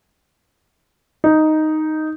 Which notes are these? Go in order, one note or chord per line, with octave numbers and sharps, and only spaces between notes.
D#4